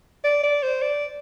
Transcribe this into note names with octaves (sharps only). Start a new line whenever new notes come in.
D5
D5
C5
D5